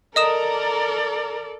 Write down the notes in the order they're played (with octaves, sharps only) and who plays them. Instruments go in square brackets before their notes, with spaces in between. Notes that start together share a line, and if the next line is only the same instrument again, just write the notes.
[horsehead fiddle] A4 D5 [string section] A#4 [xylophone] D#5 D#6 E7